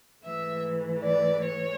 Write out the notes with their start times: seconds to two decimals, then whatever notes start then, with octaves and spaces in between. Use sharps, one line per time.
0.23 G#2 E3 A3 E5
1.04 D5
1.45 C#5